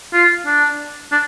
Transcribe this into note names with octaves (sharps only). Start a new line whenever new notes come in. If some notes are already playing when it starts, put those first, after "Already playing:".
F4
D4
D4